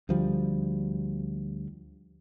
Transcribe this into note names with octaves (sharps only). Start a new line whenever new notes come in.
D2 F3 G3